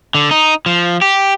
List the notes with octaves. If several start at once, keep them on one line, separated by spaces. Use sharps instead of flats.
D3
D#4
F3
G4